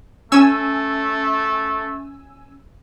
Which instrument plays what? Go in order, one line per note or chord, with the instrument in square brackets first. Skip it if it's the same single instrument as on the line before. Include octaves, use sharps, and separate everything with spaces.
[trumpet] A3 [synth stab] C#4 G#5 E6